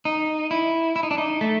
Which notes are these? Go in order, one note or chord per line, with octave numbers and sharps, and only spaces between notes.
D#4
E4
E4
D#4
D4
D#4
A3